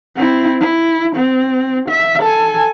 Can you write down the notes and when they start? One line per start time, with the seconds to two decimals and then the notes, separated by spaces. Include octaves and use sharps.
0.16 C4 E4
0.60 E4
1.16 C4
1.89 E5
2.22 A4 G#5